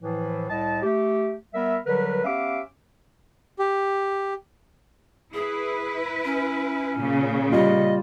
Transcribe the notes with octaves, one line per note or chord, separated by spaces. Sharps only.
A2 E3 F3
C2 A2 D#5 A5
A3 G4
G3 B3 A#4 E5
D3 F#3 G3 A#4 B4
B3 C#4 G4 E5 F5 D6
G4
E4 G#4 B4
C#4
A#2 C#3
G3 F4 D#5